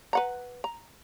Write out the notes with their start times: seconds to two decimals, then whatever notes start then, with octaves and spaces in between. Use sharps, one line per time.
0.13 B4 F#5 A#5
0.64 A#5